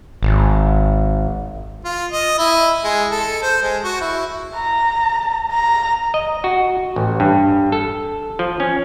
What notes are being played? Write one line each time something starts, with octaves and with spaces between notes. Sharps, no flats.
G#1
F4
D#5
E4
G#3
A4
C5
G#3
F#4
E4
A#5
A#5
D#5
F#4
A1
G2
A4
F3
C#4